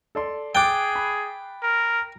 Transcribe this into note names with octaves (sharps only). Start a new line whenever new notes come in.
A4 D5 C6
G#4 G5 D6 F#6 G6 A6
B5
A#4